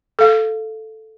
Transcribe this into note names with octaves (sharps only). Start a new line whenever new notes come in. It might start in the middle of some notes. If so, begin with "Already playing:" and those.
A4 F5